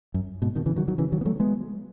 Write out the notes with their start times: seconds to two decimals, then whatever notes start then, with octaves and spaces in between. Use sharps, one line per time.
0.14 F#2
0.42 G#2 B2
0.55 B2 D#3
0.66 C#3 E3
0.76 D#3 F#3
0.88 D#3 F#3
0.98 C#3 E3
1.12 D#3 F#3
1.21 B3
1.25 F#3 A3
1.40 G#3 B3